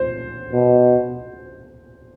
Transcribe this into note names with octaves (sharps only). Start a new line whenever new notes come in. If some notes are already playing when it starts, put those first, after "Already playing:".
Already playing: C5
B2